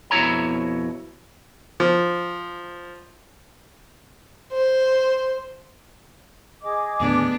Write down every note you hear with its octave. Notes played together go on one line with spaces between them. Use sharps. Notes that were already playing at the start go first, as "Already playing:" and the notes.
F2 B2 E4 C#5 A#5
F3
C5
G#4 D#5 D6
D#2 A2 D3 B3 D4